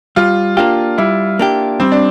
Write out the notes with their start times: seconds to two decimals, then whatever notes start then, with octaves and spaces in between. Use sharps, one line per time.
0.16 G3 F4
0.57 A#3 D4 F4 G4
0.98 G3 E4
1.39 A#3 D4 G4
1.80 G3 C4
1.92 D4